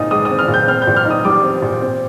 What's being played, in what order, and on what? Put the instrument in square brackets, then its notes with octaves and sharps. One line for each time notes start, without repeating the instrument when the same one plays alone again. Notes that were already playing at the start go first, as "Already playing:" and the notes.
Already playing: [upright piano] A#2 C4 D#4 D#6
G#3 D#6
D#6
C4
F6
A#2
G6
C4 F6
G6
A#2
F6
D#4
D#6
G3 D6
C4
A#2
C4